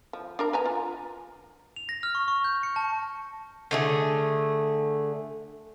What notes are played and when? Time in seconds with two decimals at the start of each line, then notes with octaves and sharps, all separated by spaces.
0.13 F3
0.39 D4 A#4 A#5
0.53 B4 G#5 A#5
0.65 F4
1.76 F7
1.89 A#6
2.03 F6
2.15 C#6
2.28 C#6
2.44 G6
2.63 C#7
2.76 A5
3.71 D3 A3 G#4